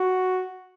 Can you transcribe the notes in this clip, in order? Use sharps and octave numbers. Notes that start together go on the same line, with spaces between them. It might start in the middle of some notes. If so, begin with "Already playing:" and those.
Already playing: F#4